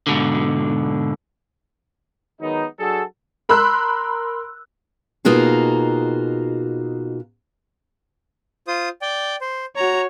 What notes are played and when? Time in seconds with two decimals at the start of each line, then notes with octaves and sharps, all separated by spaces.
0.07 G#2 B2 D3
2.41 D#3 F#3 G#3 B3 D#4
2.79 F#3 D4 F#4 G#4 A4
3.49 A#4 B5 C6 E6 F#6
5.25 B2 A#3 D#4 F4 F#4 G#4
8.68 F4 C5 D#6
9.02 D5 G5
9.41 C5
9.76 F#4 C#5 A#5